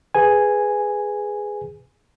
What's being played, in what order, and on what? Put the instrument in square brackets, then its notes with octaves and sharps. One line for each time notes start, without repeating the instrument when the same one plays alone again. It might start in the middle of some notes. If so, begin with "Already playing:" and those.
[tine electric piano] G#4 B4 G#5